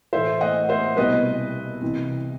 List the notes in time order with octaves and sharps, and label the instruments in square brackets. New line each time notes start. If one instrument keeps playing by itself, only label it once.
[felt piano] A2 E3 A3 C5 E5
D#5 F#5
C5 E5
C2 B2 G3 C4 B4 D#5
C2 C3 E3